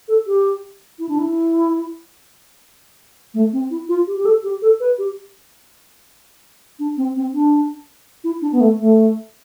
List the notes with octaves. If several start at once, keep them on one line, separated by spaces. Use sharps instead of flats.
A4
G4
E4
D4
E4
A3
C4
E4
F4
G4
G4
A4
G4
A4
B4
G4
D4
C4
C4
D4
E4
D4
B3
A3
A3